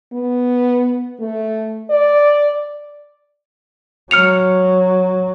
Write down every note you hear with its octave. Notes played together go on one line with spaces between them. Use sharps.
B3
A3
D5
F#3 F6 C#7 F7